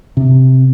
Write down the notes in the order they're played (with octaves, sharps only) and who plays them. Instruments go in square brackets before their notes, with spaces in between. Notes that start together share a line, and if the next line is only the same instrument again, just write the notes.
[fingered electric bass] C3